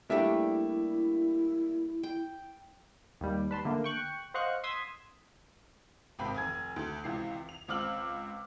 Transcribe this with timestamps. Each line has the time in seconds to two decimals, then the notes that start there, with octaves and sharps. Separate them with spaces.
0.10 G3 A3 A#3 D4 E4 G4 E5
2.03 G5
3.21 D#2 G3
3.51 B4 A5 C6
3.65 D3 A3 A#3
3.84 G5 C#6 F#6
4.34 C5 D#5 F5 F#5 C#6 F#6
4.64 C6 D#6 E6 G#6 B6
6.19 G#1 C3 C4 G5 B5
6.34 F1 G#5 G#6
6.76 D2
7.04 C#2 C3 E3 C7
7.49 F7
7.68 C#2 C4 D6 E6 F6 F#7